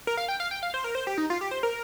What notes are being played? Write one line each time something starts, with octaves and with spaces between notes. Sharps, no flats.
A#4
F5
G5
F5
G5
F5
C5
A#4
C5
G4
D#4
F4
G4
C5
A#4